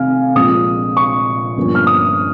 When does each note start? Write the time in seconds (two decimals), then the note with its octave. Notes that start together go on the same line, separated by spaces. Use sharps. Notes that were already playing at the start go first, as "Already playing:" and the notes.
Already playing: F1 F2 C3 D#3 F5 G#5 F6
0.35 A#1 A#2 F3 G#3 C4 D#6
0.97 C#6
1.57 G1 G2 F3 A#3 C#4
1.75 F6
1.87 D#6